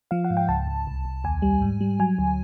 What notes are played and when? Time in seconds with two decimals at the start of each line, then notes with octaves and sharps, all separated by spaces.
0.11 F3 F5
0.25 F#5
0.30 G#2
0.37 G5
0.48 C#2 A5
0.67 C#2
0.87 C2
1.05 C2
1.24 D#2 G#5
1.42 G3
1.61 G#2
1.81 G3
1.99 F#3 G#5
2.19 D2